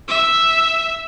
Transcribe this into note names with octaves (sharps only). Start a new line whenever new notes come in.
E5